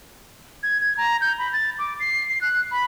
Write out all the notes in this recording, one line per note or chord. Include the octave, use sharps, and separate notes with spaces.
G#6
G#6
A#5
G6
B5
A6
D6
C7
C7
F#6
B5